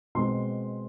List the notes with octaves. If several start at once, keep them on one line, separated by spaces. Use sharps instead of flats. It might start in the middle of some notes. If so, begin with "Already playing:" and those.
B2 G#3 C4 C6